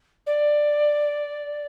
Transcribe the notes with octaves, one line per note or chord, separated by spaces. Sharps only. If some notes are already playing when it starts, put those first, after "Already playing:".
D5